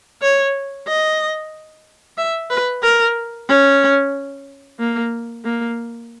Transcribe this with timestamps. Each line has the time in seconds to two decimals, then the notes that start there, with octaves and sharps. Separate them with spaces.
0.22 C#5
0.88 D#5
2.18 E5
2.51 B4
2.83 A#4
3.49 C#4
4.79 A#3
5.45 A#3